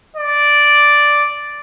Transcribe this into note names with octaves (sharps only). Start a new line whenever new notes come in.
D5